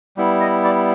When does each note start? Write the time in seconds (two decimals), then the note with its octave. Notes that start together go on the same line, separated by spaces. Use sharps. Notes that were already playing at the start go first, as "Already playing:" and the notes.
0.17 G3 B3 E4
0.41 D#5
0.64 D5